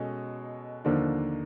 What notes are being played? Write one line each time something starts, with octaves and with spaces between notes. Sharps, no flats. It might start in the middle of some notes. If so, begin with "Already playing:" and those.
Already playing: B2 G#3 C#4 A4
D#2 D3 F3 A#3 D4